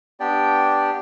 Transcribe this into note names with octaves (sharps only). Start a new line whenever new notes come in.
B3 D4 G4 D5 G5